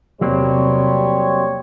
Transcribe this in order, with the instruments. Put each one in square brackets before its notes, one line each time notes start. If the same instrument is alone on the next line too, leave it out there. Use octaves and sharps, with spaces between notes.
[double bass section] E2 C3 [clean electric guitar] F#3 A#3 C4 [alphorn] G3 [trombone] C#5